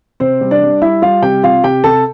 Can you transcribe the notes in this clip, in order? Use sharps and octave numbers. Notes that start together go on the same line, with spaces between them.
C3 C4 C5
G3
D4 D5
G3
G3 E4 E5
G3 F4 F5
C3 G4 G5
C3 F4 F5
C3 G4 G5
C3 A4 A5